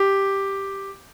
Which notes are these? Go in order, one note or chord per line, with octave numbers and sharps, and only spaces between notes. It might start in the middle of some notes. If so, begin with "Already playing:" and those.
Already playing: G4